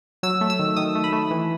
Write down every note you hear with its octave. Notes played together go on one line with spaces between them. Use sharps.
F#3 E6
A3
E6
D#3
D#3 D#6
A3
B5
A3
E3